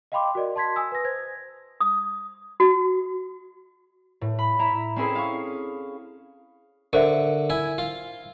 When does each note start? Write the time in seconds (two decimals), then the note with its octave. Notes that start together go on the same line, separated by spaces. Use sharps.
0.12 D#5 F5 G5 B5 C6 D6
0.35 F#4 A#4 D5 D#5
0.56 A5 C6 G#6 B6
0.76 G#5 D#6 E6
0.92 B4 A#6
1.04 C5 G#6
1.81 D#6
2.60 F#4
4.21 A2
4.38 B5
4.59 E4 E5 A#5
4.96 C4 C#4 E4 G#4 A4 C5
5.15 F5 C#6
6.93 D3 A#4 C5 E5 C#6
7.50 E4 G#5
7.78 F4